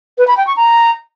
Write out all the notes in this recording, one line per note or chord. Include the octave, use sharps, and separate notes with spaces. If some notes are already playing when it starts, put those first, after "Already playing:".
B4
B5
G5
C#6
A#5